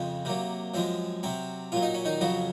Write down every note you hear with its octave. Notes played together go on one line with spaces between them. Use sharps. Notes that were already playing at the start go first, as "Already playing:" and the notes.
Already playing: F2 C#3 G#3 C4
C3 F#3 A#3
F#2 F3 G#3 C4
C3 F#3 C4
A#2 F#3 F4
D#4
C#4
D#3 D#4
F2 C#3 F#3 F#4